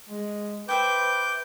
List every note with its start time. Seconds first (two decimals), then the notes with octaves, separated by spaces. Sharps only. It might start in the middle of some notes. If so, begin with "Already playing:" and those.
0.09 G#3
0.69 B4 C5 E5 G5 D6 G6